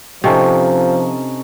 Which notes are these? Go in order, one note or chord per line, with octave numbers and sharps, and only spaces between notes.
C3 F3 C#4 D#4 A4